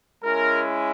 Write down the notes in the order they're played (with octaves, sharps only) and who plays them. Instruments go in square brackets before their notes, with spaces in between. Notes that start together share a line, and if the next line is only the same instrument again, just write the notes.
[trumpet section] G#3 C#4 E4 A#4